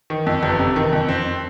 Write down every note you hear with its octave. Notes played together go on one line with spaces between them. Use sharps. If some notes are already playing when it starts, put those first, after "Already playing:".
D#3
F2
G1
C3
D#3
F2
C4